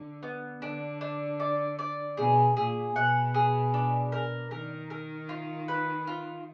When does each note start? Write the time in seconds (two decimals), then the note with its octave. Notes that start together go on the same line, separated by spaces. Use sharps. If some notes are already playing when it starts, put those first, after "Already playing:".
Already playing: D3
0.23 B3
0.62 D3 D4
1.01 D4
1.40 D5
1.79 D5
2.17 B2 G#4
2.57 A#2 G#4
2.95 B2 F#5
3.34 G#4
3.74 D4
4.12 A#4
4.51 D#3 A#4
4.90 A#4
5.29 F4
5.68 B4
6.07 F4